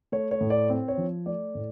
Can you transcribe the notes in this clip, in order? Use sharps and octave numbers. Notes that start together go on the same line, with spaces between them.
A3 C#5
C#5
A2
D5
C4
C#5
F3
A3 D5
A2